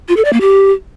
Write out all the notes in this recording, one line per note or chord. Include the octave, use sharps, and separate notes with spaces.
F4
A4
D5
A#3
G4